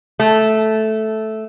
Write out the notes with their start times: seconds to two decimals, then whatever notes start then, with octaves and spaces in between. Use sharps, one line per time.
0.19 A3